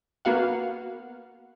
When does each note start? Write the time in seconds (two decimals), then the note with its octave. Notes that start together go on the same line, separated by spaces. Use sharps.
0.25 A#3 B3 F#4 F5 F#5